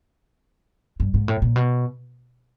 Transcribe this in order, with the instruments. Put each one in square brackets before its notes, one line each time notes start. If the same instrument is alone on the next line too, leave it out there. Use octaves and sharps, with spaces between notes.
[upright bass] G2
G#2
A2
A#2
B2